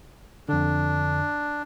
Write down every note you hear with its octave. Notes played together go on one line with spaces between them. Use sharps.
F2 D3 D4